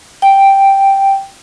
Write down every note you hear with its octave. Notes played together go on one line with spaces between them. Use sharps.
G5